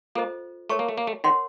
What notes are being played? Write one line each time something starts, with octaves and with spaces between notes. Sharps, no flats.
A#3 F4 A4 C5 D#5
A3 A#4 C#5 A5 C#6
A#3
A3
A#3
A3
D#3 A#4 C#5 F#5 C6